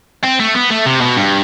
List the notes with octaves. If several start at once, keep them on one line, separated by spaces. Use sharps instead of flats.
C4
A3
B3
A3
C3
B2
G2